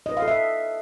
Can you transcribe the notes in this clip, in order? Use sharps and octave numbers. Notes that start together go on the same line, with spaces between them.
D#5
B4
F5
A4
E5